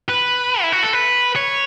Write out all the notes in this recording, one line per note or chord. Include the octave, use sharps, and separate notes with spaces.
B4
E4
F#4
A4
B4
C#5